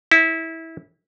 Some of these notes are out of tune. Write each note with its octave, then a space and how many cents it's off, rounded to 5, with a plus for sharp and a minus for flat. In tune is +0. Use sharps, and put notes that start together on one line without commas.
E4 -20